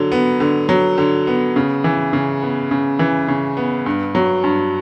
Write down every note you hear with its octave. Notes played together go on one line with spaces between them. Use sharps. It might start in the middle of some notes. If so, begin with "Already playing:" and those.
Already playing: D3 F#3
B3
D3
F#3
D3
B3
C#3
E3
C#3
B3
C#3
E3
C#3
B3
G2
F#3
G2